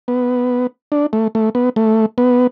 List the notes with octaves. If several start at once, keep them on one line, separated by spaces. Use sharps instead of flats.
B3
D4
A3
A3
B3
A3
B3